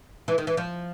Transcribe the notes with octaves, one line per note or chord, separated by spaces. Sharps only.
E3
D#3
E3
F3